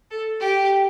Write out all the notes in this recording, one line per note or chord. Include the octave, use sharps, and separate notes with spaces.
A4
G4